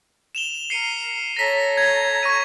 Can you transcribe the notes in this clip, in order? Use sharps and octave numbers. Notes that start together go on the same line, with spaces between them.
E7 F7 G7
A#4 C7 C#7 D#7
A4 C#5 A#5 A#6 B6
G#6
C#6 G#6 D#7